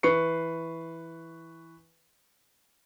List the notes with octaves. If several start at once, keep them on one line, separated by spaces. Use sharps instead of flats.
E3 B4 C#6 C7 C#7